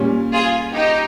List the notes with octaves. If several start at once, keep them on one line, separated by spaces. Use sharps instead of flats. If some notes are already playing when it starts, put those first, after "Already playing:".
Already playing: A#2 G3 C#4
F4 G#4
D#4 G4